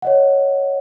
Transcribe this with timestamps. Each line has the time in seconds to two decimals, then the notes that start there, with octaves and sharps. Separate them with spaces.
0.02 C#5 D#5 F#5